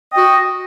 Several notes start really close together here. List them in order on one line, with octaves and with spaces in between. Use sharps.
D#5 G5 F#4